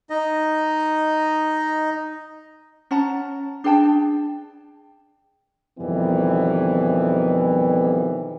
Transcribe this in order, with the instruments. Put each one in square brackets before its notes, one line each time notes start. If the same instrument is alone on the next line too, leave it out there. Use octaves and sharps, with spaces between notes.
[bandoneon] D#4 D#5
[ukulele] C#4 F#5 A5 A#5
D4 G#4 G5 A5
[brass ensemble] F2 B2 D#3 E3 G3 B3